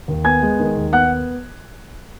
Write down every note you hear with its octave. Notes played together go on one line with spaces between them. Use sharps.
D#2
B3 G#5 G#6
G#3
D#3
D#2
B3 F#5 F#6